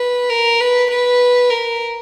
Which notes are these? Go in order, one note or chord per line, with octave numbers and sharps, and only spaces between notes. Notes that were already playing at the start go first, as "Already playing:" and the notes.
Already playing: B4
A#4
B4
B4
A#4